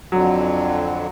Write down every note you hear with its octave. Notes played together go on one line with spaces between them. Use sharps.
F2 D3 F#3